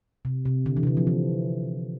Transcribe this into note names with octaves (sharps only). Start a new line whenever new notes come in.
C3
C3
D3
E3
C3
D3
F3
E3